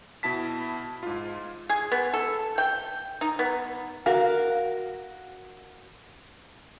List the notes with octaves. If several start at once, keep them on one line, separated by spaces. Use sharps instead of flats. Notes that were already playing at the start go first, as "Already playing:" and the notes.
B2 E4 A5 B6
G#2 F4
G#4
B3
A4
G5
D#4
B3
F#4 A#4 F5